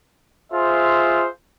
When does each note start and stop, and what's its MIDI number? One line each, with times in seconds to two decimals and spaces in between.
0.52 1.26 65
0.52 1.26 68
0.52 1.26 72
0.52 1.26 76